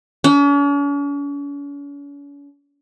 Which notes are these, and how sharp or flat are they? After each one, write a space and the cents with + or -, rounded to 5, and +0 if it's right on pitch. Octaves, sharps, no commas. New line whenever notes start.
C#4 +45